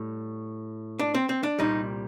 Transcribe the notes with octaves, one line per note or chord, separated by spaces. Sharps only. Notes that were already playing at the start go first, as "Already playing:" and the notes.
Already playing: A2 G3
D4
C4
C4
D4
C2 A#2 G3 D#4